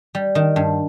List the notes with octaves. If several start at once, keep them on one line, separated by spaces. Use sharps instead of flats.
G3
D#3
G2